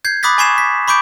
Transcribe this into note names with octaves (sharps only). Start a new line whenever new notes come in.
G6 G#6 C7
B5 D6 D#6 F#6 A6 B6
G#5 B5 C#6 G#6 C7 E7
B6
B5 C#6 D6 G6 D7